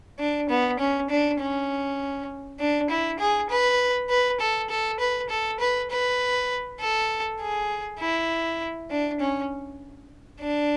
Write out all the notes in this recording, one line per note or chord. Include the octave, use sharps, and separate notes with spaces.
D4
B3
C#4
D4
C#4
D4
E4
G#4
B4
B4
A4
A4
B4
A4
B4
B4
A4
G#4
E4
D4
C#4
D4